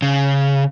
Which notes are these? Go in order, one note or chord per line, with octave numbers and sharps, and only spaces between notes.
C#3